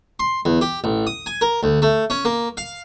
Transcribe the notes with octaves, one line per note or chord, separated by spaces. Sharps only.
C6
E2
G4
A1
D#6
G#5
A#4
D2
A3
C#4
A#3
F5